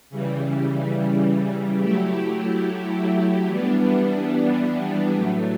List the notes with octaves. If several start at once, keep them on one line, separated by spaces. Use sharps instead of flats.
C#3 E3 G3
F#3 A3 E4 G4
E3 G3 B3 D4
A2 F#3 A3